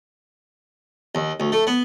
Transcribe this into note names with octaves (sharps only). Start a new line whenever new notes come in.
D#2
D2
A3
B3